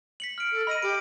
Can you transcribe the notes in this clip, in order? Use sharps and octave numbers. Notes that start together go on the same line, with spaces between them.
B6 C#7 F#7
F6 D7
A4
D#5 B5 D#7
G4 D7